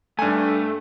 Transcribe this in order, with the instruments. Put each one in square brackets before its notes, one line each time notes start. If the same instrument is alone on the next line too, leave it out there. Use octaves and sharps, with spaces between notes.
[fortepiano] G2 G#5 [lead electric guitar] A3